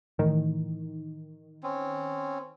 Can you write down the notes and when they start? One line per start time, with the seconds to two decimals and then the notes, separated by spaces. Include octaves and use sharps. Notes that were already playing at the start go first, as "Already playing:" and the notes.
0.19 A2 D#3 E3
1.63 C4 C#4